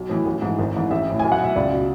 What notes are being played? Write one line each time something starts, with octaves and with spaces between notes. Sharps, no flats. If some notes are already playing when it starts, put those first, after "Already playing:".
Already playing: B1
A2 E3
A1
G#2 E3
G#1
G#2 E3
A1 E5
A2 E3
B1 G#5
F#5
B2 E5
C#2 D5
B2